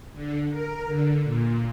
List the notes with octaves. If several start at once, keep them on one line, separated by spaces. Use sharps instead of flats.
D3
A#4
D3
A#2